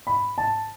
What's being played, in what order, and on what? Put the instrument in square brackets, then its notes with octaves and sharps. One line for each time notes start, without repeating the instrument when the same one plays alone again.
[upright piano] B5
A5